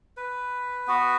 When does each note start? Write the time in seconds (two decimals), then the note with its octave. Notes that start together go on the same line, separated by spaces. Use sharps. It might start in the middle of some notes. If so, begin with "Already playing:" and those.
0.17 B4
0.88 B3 F#4